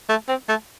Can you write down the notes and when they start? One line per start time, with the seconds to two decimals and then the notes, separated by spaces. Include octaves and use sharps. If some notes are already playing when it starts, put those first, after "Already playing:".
0.09 A3
0.28 C4
0.49 A3